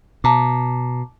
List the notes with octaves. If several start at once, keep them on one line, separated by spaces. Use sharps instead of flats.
B2 A5 A#5 D6